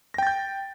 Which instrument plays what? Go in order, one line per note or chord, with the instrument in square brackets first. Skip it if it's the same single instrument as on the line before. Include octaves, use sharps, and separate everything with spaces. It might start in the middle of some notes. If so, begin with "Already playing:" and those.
[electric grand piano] A#6
G5
A6
G6